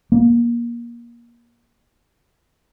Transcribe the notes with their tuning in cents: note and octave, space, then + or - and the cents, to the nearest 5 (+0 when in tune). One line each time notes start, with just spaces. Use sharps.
A#3 +25